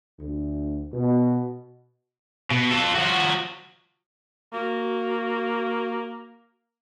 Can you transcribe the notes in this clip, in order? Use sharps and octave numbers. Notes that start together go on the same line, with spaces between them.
D2
B2
B2
F4 A4
F3 F#4
A#3 F#4